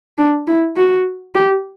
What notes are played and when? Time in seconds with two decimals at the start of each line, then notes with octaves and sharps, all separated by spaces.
0.18 D4
0.47 E4
0.76 F#4
1.35 G4